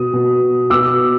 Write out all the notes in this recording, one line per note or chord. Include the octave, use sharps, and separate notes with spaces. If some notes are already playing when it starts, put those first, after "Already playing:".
Already playing: B2 D#6
B2
B2 D6 E6